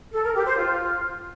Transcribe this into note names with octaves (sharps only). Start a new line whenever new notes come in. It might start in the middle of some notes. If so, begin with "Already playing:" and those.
A4
A#4
G4
C5
F4